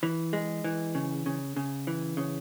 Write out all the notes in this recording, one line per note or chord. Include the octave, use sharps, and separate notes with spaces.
E3
G#3
E3
C#3
C#3
C#3
E3
C#3